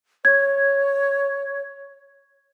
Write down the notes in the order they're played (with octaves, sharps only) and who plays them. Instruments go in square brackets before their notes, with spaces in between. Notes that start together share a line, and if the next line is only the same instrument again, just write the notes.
[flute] C#5 [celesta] G#6